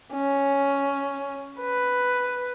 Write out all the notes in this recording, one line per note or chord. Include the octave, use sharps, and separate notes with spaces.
C#4
B4